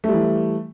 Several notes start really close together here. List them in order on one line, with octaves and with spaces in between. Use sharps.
A3 G3 E3